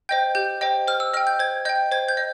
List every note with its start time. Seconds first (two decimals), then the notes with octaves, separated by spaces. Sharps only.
0.09 C5 D#5 G5 G6
0.35 G4 G6
0.61 C5 D#5 G5
0.88 C5 F6
1.00 E6
1.14 D#5 G5 F6
1.27 G6
1.39 C5 G#6
1.65 D#5 G5 G6
1.92 C5 G#6
2.09 G6
2.17 D#5